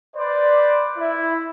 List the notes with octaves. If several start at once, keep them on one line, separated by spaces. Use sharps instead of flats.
B4 C5 D5
E4